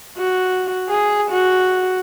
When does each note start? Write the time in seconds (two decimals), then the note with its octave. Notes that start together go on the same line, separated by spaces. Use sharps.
0.18 F#4
0.89 G#4
1.31 F#4